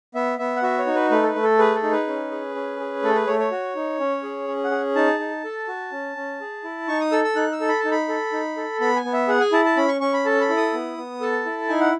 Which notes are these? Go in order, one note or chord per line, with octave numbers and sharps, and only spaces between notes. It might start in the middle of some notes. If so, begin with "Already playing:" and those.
B3 E5
B3 E5
F#5
F#4 E5
C#5
D#4
B4
A3 B4
A4
B4
A3
A4
G#4 B4
A4
D#4
B4
C#4
G#4
C#4
G#4
A3 A4
B4
A3 C#5
C#5
F#4
D#4
C#4
G#4
C#4
F#5
G#4
D#4 A5
D#4
A4
F#4
C#4
C#4
G#4
E4
D#4 C#6
D#6
A4 E6
E6
D#4 F#6
E6
A4
B5
A5
D#4
B5
A4
D#4
A4
B3 B5
G#5
B3
E5
G#4 F#5
G#5
E4 A5
A5
C#4 B5
C#6
C#4 C#6
B5
A4 A5
B5
E4
D#6
B3
B3
A4 A5
E4
D#4 G#5
F#5